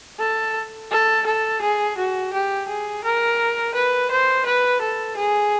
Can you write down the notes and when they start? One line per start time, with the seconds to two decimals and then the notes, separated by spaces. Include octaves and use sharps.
0.19 A4
0.91 A4
1.26 A4
1.62 G#4
1.97 F#4
2.33 G4
2.68 G#4
3.04 A#4
3.74 B4
4.11 C5
4.46 B4
4.81 A4
5.17 G#4